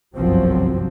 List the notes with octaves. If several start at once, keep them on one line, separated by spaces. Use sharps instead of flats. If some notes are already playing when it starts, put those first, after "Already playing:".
G1 C2 F#2 F3 F#3 C4